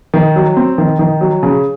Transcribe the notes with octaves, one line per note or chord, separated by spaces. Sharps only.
D#3
F#3
C4
D#3
D#3
F#3
C#3